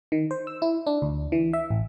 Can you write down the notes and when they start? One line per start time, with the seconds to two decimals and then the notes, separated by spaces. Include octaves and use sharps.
0.12 D#3
0.31 C5
0.47 E6
0.62 E4
0.87 D4
1.02 D2
1.32 E3
1.53 E5
1.70 A1